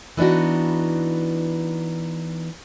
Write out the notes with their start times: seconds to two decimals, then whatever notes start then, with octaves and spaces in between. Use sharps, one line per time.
0.17 E3 B3 D4 D#4 F#4